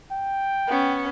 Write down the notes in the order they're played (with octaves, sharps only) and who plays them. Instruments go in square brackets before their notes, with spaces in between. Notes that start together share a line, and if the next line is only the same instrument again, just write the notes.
[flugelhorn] G5
[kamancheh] B3 C#4